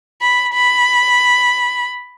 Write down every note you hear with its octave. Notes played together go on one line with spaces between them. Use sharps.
B5
B5